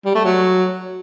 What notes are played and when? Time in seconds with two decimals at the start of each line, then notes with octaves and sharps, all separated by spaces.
0.05 G3
0.15 A3
0.24 F#3